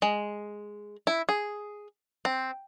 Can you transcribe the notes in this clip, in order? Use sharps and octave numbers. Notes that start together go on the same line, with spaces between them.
G#3
E4
G#4
C4